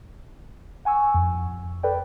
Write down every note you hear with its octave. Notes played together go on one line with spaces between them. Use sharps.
F#5 G#5 C#6 E6
F2
A4 B4 D5 G5